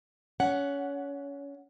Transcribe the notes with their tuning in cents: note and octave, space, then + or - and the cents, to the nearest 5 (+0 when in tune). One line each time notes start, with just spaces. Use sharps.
C#4 +25 F#5 +0